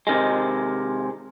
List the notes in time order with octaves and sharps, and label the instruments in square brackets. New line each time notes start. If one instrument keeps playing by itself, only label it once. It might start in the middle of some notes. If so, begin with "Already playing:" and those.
[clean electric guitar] C3 D#3 G#3